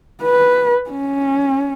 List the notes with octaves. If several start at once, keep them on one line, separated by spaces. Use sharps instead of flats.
B4
C#4